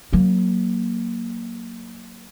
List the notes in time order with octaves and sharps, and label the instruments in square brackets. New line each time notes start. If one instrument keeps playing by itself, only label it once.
[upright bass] F#3 A#3